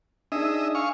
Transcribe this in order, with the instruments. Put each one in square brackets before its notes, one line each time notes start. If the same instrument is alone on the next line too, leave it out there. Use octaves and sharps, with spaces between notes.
[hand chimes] D4 D#4 G#4 [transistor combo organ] D#5 E5
[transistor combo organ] F5 C#6 [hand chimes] G#5